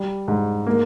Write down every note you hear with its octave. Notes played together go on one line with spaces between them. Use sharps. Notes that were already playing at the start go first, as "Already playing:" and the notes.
Already playing: G3
G#2
A#3